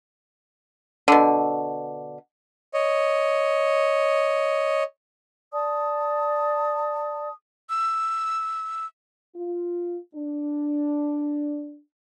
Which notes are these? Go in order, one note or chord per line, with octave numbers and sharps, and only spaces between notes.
B2 D3
C#5 D#5
D5 A5 D#6
E6
F4
D4